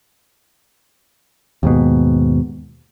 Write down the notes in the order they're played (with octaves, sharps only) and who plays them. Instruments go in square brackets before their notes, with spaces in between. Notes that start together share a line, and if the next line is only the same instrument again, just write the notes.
[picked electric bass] D#2 G#2 B2